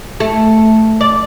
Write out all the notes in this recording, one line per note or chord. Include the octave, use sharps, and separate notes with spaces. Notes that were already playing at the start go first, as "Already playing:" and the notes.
A3
D5